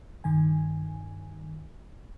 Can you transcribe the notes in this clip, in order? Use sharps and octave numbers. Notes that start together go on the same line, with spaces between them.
G2 D#3 G#5